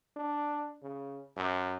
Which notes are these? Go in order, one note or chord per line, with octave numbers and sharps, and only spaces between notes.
D4
C#3
F#2